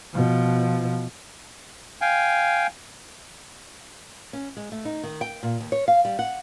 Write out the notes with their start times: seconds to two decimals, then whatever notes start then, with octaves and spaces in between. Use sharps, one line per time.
0.14 B2 F3
2.01 F5 G5 G#5
4.33 C#4
4.57 G#3
4.72 A3
4.85 D#4
5.03 D#3
5.21 G5
5.43 A#2
5.61 D#2
5.72 C#5
5.88 F5
6.05 G3
6.19 F#5